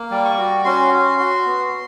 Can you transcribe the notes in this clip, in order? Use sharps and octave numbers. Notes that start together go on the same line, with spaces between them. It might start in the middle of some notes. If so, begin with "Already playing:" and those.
Already playing: A#3
G3
C#6
F#4
C#4 C6
F#4
F#4
B3